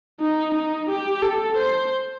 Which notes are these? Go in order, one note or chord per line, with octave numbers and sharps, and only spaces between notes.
D#4
D#4
G4
A4
C5